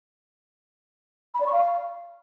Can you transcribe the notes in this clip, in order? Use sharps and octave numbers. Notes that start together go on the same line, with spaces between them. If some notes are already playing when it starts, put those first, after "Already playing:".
B5
D5
C#6
F5